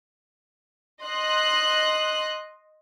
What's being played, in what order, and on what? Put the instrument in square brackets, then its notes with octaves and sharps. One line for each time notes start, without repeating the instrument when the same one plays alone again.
[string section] D#5 C6 F#6